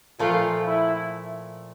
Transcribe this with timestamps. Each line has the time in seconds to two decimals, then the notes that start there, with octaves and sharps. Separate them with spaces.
0.19 A#2 F3 A3 F4
0.64 E4